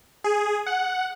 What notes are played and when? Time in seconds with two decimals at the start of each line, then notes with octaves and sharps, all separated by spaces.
0.24 G#4
0.66 F#5